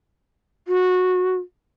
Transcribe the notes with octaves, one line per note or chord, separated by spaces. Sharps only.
F#4